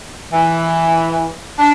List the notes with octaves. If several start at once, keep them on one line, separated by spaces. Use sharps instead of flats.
E3
D4